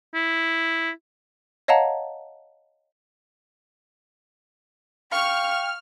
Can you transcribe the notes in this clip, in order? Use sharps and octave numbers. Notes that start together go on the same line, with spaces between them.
E4
C#5 D#5 F5 F#5 A5 A#5
F5 G5 C#6 F6